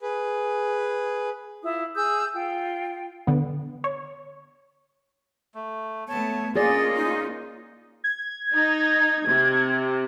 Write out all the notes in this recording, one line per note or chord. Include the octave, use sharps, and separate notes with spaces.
G#4 B4
E4 F4 D#6
G#4 D#6 E6 G6
F4 G5
D3 B3
C#5
A3
A3 B3 C#5 A5
A#3 C#4 F4 G#4 D5 D#5 A6
D#4
G#6
D#4
C3